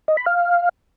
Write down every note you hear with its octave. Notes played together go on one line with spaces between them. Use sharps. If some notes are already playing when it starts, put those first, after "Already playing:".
D#5
B5
F5